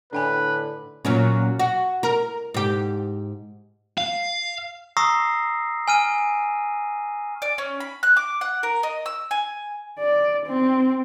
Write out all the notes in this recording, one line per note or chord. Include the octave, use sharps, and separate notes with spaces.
A2 D3 D4 B4 G5 G#5
A#2 F#3 C#4
F#4
A#4
G#2 G4
F5
A#5 C#6 D#6 E6 A#6 C7
G#5 F6 D#7
D5
C#4
B5
F#6
D6
F#5
A#4
D#5
E6
G#5
D5
C4